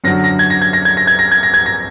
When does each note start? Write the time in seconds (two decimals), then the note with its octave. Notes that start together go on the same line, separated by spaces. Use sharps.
0.04 F#2 D3 F#3 A#6
0.24 A#6
0.39 G#6
0.50 A#6
0.61 G#6
0.73 A#6
0.85 G#6
0.97 A#6
1.07 G#6
1.19 A#6
1.31 G#6
1.43 A#6
1.54 G#6
1.66 A#6